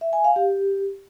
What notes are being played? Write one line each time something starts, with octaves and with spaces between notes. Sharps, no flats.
E5
G#5
F5
G4